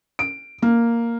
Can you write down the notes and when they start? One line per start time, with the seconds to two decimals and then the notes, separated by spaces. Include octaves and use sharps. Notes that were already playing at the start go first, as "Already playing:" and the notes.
0.19 D7
0.62 A#3